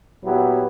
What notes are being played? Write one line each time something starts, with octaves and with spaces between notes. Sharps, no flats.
A#2 F#3 B3 E4 G4